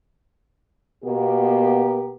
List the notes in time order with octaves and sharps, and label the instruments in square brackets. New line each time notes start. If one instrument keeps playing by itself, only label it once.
[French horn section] B2 A#3 B3 G4 A#4